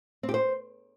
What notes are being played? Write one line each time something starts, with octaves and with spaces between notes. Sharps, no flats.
C4
G4
C5